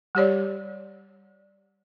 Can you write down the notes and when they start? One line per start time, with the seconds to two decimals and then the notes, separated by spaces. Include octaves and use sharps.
0.15 G3 G4 C#5 D5